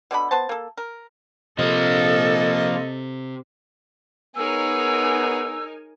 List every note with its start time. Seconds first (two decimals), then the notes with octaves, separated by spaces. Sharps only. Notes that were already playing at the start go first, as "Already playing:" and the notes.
0.11 B2 D3 C#4 B5
0.31 B3 C5 A5
0.49 A#3 A4
0.77 A#4
1.59 C3 F3 A#3 A4 D#5
4.36 B3 D#4 G#4 A#4 C#5 G#5 E6